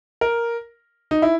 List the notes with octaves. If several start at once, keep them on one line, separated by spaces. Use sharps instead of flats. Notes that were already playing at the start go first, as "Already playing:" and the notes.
A#4
D#4
E4